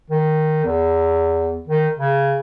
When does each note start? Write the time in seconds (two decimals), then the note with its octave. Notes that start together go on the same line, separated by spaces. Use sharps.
0.10 D#3
0.64 E2
1.67 D#3
1.99 C#3